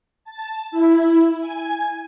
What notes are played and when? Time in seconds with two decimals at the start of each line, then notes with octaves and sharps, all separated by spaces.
0.25 A5
0.71 E4
1.40 G#5